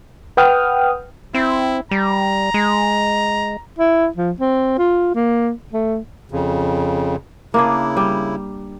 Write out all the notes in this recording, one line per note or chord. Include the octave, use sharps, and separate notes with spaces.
B4 F#5 G5 D#6 F6
C4 E4
G3 A#5
G#3
E4
F3
C4
F4
A#3
A3
F2 C#3
C#3 A#3 D4 E4 G#4
G3